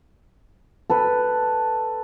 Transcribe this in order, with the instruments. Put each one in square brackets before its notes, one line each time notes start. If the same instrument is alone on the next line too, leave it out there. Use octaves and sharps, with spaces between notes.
[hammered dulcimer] A4 B4